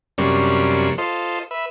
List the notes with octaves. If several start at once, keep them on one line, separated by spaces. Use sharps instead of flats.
F#2 C3 G3 A#3 C#4 D4
F4 A4 C5 D#5
B4 E5